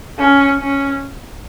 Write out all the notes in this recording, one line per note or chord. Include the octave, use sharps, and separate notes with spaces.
C#4
C#4